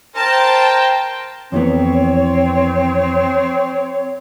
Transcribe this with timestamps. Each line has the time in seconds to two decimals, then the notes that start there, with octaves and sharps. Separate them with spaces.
0.16 A#4 C5 G5 A5
1.52 F2 E3 B3 C4 C#5